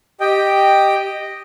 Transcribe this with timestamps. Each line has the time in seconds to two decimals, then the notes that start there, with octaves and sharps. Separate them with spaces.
0.20 G4 D#5 G5